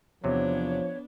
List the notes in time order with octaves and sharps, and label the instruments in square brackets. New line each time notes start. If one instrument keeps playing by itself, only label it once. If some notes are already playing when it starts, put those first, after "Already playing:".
[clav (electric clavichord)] E2 C3 F#3 [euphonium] F3 [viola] B3 D4 [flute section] C#5